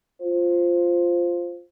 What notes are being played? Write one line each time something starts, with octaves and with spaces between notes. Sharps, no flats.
F4 C5